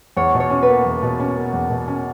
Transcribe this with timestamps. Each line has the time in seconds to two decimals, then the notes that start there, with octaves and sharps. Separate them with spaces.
0.17 E2 C#5
0.34 B2
0.40 C#5
0.50 C#4
0.63 B4
0.68 A#3
0.86 E2
1.02 B2
1.20 C#4
1.36 A#3
1.53 E2
1.70 B2
1.88 C#4